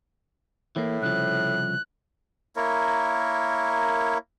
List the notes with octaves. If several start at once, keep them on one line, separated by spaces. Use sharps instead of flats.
A2 E3 A#3
C2 C#3 F3 F#6
A#3 E4 A#4 C#5